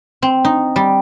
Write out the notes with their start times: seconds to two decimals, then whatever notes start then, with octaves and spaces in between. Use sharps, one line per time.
0.22 C4
0.45 D#4
0.76 G3